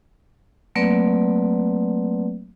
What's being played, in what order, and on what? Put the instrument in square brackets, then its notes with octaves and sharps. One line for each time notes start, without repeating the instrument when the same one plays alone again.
[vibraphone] F#3 A3 A#3 C4 B4 D5